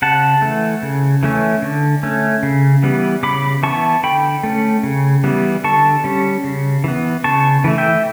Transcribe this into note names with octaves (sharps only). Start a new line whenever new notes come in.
C#3 F#5 A5
E3 A3
C#3
E3 A3 C#4
D3
A3 C#4
C#3
E3 G3 B3
C#3 B5 D6
E3 B3 A5 C#6
D3 G5 B5
A3 C#4
C#3
E3 G3 B3
D3 A5 C#6
G3 C#4
C#3
E3 B3
C#3 A5 C#6
E3 A3
E5 G5